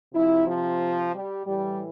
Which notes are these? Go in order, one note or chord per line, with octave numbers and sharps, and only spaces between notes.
C3 F3 E4
F3
G3
A2 E3 G3